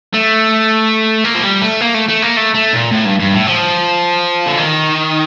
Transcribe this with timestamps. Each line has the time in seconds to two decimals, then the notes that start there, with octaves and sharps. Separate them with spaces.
0.14 A3
1.24 A#3
1.35 F3
1.43 G3
1.62 A3
1.81 A#3
1.94 A3
2.08 A3
2.22 A#3
2.36 A3
2.54 A3
2.73 A#2
2.91 A2
3.05 G2
3.20 G2
3.33 A2
3.47 F3
4.46 D3
4.58 D#3